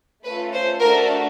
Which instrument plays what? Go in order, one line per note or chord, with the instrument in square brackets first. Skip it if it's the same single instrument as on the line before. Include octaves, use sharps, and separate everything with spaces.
[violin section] A3 C#4 F4 A4 B4
C5
A3 D4 F#4 A4 A#4